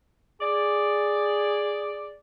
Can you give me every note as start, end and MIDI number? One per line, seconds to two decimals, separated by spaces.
0.41 2.16 68
0.41 2.16 74